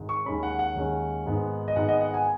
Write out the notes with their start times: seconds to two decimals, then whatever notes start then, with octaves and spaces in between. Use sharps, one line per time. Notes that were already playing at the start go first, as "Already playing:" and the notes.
Already playing: G#1 G#2
0.09 C#6
0.25 D#2 D#3 G#3 C#4 B5
0.43 F#5
0.59 F#5
0.76 D#2 D#3 G#3 C#4
1.26 G#1 G#2 G#3 B3 D#4
1.68 D#5
1.76 G#1 G#2 G#3 B3 D#4 F#5
1.89 D#5
2.01 F#5
2.14 G#5